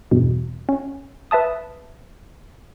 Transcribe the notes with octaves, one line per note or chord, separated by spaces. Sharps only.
E2 G2 B2
C#4
B4 E5 A5 D#6